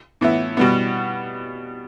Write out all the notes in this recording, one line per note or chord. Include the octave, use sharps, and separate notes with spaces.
A2 E3 B3 E4
B2 G3 B3